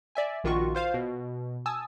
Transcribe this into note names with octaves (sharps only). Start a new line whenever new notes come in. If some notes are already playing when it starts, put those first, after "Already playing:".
D5 E5 G#5
A#1 D#3 F4 F#4 C#6
F4 C5 F5
B2
G#5 A5 D#6 E6